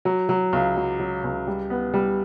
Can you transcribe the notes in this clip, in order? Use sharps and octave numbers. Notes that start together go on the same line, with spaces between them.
F#3
F#3
C#2
F#3
F#3
C#2
G3
B3
G3